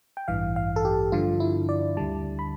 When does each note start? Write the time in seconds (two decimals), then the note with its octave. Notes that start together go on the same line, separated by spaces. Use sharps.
0.17 G5
0.28 A1 G2 E3 F5
0.56 F5
0.76 A4
0.85 G4
1.12 G2 D3 F3 F4
1.40 E4
1.69 D5
1.97 D2 D3 G3 A5
2.39 B5